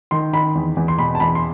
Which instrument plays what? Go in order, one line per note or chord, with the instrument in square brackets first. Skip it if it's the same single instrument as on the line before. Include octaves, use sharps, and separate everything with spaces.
[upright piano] D#3 C6
D#3 B5
E2
E2
C6
B2 B5
A5
E2 B5
C6